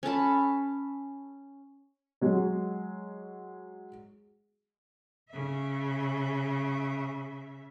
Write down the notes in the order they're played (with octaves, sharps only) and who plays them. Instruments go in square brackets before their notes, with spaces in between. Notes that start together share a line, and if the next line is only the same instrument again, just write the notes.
[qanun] C#4 A4 A5 B5
[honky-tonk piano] F#3 G#3
[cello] C#3 E5